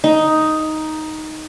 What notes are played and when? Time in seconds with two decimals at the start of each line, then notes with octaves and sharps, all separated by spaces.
0.04 D#4